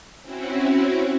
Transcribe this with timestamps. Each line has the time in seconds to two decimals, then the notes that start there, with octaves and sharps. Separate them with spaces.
0.22 C4 C#4 E4 F#4